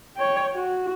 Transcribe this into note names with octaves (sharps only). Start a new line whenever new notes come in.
C#5 G5
F#4